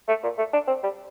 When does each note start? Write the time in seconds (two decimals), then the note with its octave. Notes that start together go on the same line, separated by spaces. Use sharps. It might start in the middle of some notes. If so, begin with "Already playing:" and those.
0.08 A3
0.23 A#2
0.38 A3
0.53 D4
0.68 C4
0.83 G3